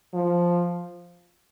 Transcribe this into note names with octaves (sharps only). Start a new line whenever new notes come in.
F3